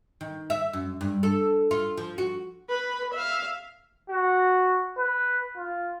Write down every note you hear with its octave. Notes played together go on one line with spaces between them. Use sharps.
D#3
E5
F#2
G2
A4
F4
F3
F#4
B4
E5 F5
F#4
B4
F4